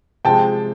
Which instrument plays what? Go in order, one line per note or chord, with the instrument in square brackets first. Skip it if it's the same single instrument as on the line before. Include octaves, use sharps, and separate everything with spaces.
[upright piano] C3 F3 G#3 G5 A5